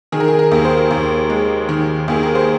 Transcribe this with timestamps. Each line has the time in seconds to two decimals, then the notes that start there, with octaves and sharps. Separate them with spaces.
0.12 D#3 G#4
0.20 A#4
0.28 G#4
0.39 A#4
0.52 D#2
0.65 C5
0.91 D#2
1.30 G#3
1.69 D#3
2.08 D#2 G#4
2.23 A#4
2.35 C5